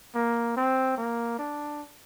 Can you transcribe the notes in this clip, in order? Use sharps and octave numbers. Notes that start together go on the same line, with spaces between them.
A#3
C4
A#3
D4